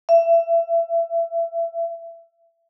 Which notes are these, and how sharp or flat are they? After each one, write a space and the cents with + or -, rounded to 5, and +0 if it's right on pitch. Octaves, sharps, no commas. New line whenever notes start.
E5 +25